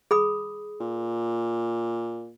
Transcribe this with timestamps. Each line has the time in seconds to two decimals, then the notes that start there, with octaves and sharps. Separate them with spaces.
0.11 G#4 B5 D#6
0.81 A#2